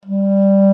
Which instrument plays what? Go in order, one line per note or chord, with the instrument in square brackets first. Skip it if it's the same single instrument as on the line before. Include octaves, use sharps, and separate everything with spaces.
[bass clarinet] G3